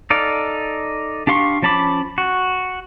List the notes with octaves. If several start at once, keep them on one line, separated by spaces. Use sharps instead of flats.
D#4 A4 D5 F5
D4 G4 F5 C6 C#6
F3 C#4 A5 B5 D6
F#4